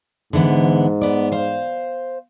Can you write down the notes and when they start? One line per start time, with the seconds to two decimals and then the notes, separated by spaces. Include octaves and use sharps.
0.33 G#2 D3 E3 B3
1.01 B3 D5
1.32 C5 F5